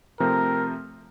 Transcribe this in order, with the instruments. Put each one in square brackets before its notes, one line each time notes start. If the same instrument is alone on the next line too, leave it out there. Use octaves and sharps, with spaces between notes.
[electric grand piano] C3 F3 A3 C4 [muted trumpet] A#4